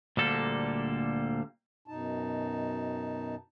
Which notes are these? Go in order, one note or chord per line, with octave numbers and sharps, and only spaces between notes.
D2 A#2 D3 G3 A#3 A4
F#2 B2 D#4 A5